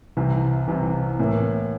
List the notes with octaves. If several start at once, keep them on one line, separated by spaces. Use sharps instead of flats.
C2 C3 E3
C2 C3 E3
A2 E3 A#3